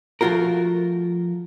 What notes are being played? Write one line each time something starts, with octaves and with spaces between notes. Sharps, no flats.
F3 A3 F4 F#4 A#4